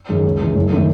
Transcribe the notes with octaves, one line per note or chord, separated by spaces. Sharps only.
F#2 D#3 G#3
C#2
C#3 E3 G#3
F#1
D#3 A3 D#4